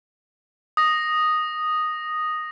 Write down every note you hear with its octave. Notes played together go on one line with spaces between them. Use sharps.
D#6 A#6